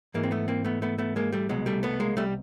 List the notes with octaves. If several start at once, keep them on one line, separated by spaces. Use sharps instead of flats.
G#2 E3 G#3 A#3
C4
A3 B3
A#3 C4
A3 B3
A3 B3
A3 B3
G#3 A#3
G3 A3
C2 B2 F#3 G#3
G3 A3
A3 B3
G#3 A#3
G3 A3